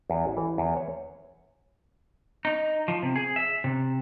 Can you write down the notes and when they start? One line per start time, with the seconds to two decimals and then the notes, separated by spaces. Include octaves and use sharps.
0.10 E2
0.25 A1
0.37 E3
0.58 E2
0.77 C#5
2.45 D#4
2.88 F3
3.03 C3
3.16 G#4
3.36 E5
3.64 C3